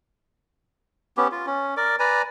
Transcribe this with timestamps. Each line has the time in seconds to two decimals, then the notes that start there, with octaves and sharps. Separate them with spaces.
1.17 B3 C#4 G4
1.32 F4
1.47 C#4
1.77 A#4 D5 D6
2.00 B4 D5 G#5 A#5